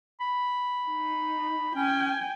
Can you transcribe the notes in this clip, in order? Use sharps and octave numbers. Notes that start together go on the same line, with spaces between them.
B5
D#4
C#4 G5 G#5